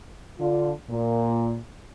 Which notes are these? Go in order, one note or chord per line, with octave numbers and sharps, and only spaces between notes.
D3 D4 F4
A#2